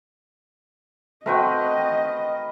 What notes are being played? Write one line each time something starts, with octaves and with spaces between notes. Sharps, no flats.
A3 C4 F#4 A#4 B4 D#5 G5